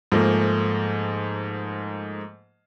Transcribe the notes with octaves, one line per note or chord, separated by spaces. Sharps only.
G#2 F3 A3 A#3